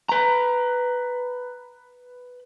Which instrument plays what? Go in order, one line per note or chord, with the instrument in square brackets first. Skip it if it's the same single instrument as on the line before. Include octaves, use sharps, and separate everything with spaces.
[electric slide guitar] B4 A#5